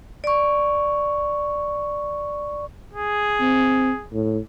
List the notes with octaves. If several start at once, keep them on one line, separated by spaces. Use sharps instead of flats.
D5 C#6
G#4
C4
A2